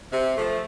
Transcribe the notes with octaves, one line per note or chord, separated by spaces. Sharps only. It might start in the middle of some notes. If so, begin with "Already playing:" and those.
C3
F3 A3